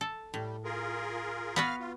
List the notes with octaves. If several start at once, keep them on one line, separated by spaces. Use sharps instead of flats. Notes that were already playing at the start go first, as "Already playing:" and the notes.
A4
A2 G3
F4 G#4 A#4
B3 F#4 B4 F5 F6
F4